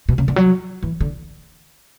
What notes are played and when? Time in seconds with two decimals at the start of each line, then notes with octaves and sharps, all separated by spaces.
0.09 B2
0.18 C#3
0.28 D3
0.36 F#3
0.83 E3
1.01 D3